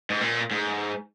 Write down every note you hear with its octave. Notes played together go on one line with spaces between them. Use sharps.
G#2
A#2
G#2